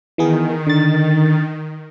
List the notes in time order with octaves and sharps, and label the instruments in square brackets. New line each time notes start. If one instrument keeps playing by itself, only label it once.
[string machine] D#3 [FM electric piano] E3 B3 G#4
[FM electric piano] D3 A6